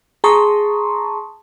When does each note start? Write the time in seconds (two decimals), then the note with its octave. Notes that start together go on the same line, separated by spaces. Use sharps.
0.24 G#4 A5 A#5 C6 C#6 D#6